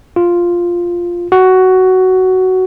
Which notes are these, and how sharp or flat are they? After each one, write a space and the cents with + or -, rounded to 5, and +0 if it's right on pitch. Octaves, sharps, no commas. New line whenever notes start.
F4 +0
F#4 +10